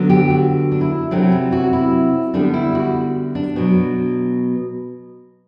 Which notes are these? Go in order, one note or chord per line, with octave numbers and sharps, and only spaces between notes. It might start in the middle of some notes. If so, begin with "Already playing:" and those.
Already playing: D3 F#3 B3
G4
F#4
D4
E4
C3 F#3 A3 C4 D4
E4
F#4
E4
D3 G3 B3 D4
E4
F#4
D4
B2 F#3